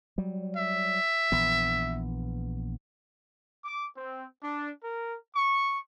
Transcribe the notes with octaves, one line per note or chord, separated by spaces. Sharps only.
F#3 G3
E5
A#1 E3 B3
D6
C4
D4
A#4
C#6